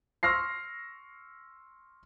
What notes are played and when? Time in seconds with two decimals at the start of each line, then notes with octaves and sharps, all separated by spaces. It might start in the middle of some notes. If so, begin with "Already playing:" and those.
0.23 C6 C#6 E6 F6 A#6 C7